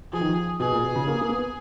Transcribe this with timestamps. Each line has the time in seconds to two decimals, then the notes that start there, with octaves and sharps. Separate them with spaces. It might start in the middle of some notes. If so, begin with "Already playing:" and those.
0.13 F3 G#4
0.21 D#3
0.29 F3
0.60 B2 G#4
0.72 A#2
0.83 B2
0.95 C#3
1.07 A#3
1.21 A#3
1.30 B3